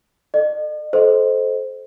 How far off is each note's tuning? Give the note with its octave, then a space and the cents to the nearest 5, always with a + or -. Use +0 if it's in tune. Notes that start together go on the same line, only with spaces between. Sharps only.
A4 +0 D#5 -45
A4 -25 C5 -5 D#5 +0